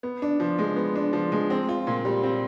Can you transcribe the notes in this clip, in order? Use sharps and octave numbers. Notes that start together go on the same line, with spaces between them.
B3
D4
F3
G#3
B3
D4
F3
G#3
C4
F4
A#2
G3
C4